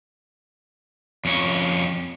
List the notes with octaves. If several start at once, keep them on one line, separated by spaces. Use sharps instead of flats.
F2 C#4